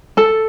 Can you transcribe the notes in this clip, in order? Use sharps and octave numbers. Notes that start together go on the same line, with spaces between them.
A4 A5